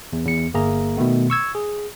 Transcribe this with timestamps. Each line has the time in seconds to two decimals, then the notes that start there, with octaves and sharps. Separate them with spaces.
0.13 E2
0.26 E2 C#7
0.54 G1 A#3 G#4 E5 A#5
0.97 B2 D#3 A3 B3
1.30 C#6 E6 G#6
1.55 G#4